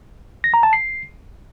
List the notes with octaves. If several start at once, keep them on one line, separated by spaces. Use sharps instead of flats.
A#6
A#5
A5
C7